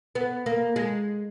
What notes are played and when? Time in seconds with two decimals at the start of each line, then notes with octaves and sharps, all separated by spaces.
0.15 B3
0.46 A#3
0.76 G#3